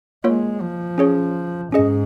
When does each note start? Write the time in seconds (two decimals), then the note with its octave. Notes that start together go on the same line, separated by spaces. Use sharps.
0.24 G#3 A#3 F4 C#5
0.61 F3
0.98 C#4 G#4 C#5
1.72 G#2 C#4 G#4 D#5